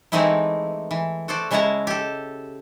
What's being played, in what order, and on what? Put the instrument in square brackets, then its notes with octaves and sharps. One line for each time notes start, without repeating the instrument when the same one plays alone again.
[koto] E3 G#3 A3 C4 D#4 E4
E3
F#4 A4 C5 D5
C#3 G#3 E4 E5 A5 A#5
G4 A4